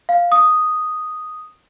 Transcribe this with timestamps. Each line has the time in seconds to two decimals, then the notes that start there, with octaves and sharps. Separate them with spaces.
0.09 F5
0.32 D#6